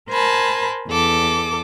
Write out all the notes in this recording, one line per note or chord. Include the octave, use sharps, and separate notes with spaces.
A#4 C5 G#5 A5 B5
E2 A4 D6